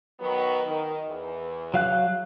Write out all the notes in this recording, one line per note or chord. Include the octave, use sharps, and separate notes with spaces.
D#3 F#3 B3
D#3
E2
F#3 F5 F#6